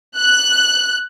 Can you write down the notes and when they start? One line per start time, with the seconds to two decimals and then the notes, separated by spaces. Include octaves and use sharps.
0.17 F#6